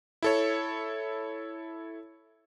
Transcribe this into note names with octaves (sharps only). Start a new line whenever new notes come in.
E4 A4 C#5